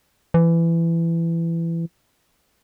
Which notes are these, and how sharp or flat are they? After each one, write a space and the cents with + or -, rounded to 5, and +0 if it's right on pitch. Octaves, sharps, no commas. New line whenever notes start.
E3 +20